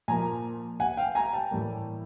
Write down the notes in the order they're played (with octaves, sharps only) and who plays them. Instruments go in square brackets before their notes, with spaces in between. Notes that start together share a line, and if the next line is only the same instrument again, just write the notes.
[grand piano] A#2 F3 A#3 G#5 A#5
F#5 G#5
F5 G5
G#5 A#5
G5 A5
A2 E3 G3 A#3